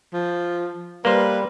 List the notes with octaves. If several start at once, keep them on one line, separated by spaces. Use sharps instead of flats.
F3
G3 A#3 B4 C5